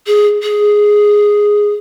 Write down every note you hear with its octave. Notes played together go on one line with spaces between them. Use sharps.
G#4
G#4